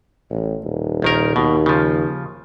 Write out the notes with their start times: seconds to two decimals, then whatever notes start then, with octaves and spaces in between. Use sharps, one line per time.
0.30 A1
0.64 D#1
1.02 A#1 D#3 A#4
1.36 D#2 B2
1.66 C#3 F3